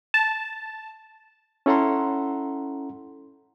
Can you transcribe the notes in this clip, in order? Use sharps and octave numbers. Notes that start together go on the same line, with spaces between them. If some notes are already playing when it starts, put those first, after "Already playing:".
A5
C#4 E4 A4 F#5 A#5 C6